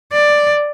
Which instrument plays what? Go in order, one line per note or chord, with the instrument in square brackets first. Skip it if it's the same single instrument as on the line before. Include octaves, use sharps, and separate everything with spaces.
[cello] D5